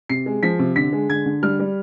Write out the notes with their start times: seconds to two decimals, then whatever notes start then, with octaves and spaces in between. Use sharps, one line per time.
0.10 C3 C7
0.26 G#3
0.43 F3 B6
0.59 C3
0.76 D3 B6
0.93 G#3
1.09 D3 G#6
1.26 D3
1.43 G3 F6
1.60 G3